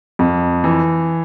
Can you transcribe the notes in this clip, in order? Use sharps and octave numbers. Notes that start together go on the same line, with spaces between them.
F2
E3